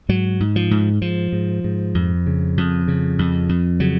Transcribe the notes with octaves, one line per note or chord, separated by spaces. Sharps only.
G#2 F#3
G#2
F3
G#2
G#2 F3
G#2
G#2
F2
C#3
F2
C#3
F2
F2
C#3 F#3